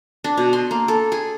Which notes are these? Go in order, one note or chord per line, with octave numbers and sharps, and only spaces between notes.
D4
B2
C6
A#3
A4
G#4